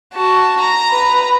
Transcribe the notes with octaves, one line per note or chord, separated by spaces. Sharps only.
F#4 A5
A#5
B4